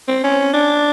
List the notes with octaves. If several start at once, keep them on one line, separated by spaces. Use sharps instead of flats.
C4
C#4
D4